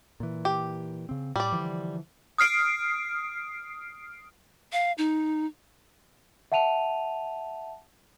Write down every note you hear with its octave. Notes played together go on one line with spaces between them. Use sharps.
A#2 E3
G4
C#3 C4
A2 G3 D5
D3 E3 F3
D#6 F6 C7 D7
F5
D#4
E5 F#5 A5 D#7 F7